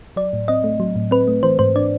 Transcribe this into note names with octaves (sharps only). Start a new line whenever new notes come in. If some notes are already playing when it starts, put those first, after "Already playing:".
F#3 D5
A2
C4 D#5
A3
F#3
A2
C4 B4
A3
E3 C5
G#2 C5
D4 D5